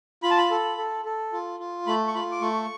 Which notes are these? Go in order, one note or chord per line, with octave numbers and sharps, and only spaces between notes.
F4 B5
A5
B5
A4
A4
A4
F4
F4
A3 B5
C#6
F4 B5
D6
A3 C#6